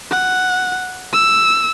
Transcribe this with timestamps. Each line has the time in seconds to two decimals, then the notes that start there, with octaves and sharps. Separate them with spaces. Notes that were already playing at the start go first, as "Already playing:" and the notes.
0.11 F#5
1.13 E6